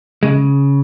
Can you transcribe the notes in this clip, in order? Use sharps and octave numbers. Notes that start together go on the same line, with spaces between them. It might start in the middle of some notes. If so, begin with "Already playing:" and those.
C#3 G#3